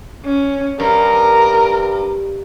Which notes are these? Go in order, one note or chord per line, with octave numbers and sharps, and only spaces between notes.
C#4
G2 A#4